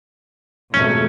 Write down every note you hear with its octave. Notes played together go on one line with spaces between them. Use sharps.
F2 B2 D#3 G#3 A3 C#4